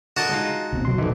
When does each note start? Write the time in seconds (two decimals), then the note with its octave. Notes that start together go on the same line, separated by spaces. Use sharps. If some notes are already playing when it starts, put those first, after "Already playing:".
0.17 D3 F#4 A#4 D#5 A5
0.31 G#3 D#4 F4
0.73 D2 B2 C4
0.85 E1 C3 F#3 C6
0.98 E1 A#1 D3 E3 D#4 A4